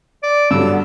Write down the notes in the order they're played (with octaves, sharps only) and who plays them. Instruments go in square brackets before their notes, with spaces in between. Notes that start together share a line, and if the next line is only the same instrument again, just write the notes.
[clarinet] D5
[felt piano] G2 F#3 [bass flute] D3 [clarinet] E6
[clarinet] B3